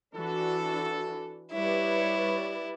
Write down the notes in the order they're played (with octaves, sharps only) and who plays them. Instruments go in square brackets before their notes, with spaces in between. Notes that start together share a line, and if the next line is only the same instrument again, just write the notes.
[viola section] E3 D4 F#4 [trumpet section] A4
[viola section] G3 B4 D5 [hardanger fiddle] E4 [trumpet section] C#5